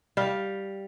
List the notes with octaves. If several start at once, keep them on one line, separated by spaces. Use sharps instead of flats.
G3 F5